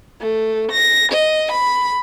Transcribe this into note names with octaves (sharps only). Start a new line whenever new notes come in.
A3
A#6
D#5
B5